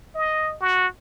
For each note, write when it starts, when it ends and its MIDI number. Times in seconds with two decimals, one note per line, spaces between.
0.15 0.55 75
0.61 0.87 66